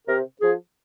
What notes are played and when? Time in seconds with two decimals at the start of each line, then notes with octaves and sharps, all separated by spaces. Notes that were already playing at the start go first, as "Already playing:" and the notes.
0.07 C3 A#4
0.41 F3 G#4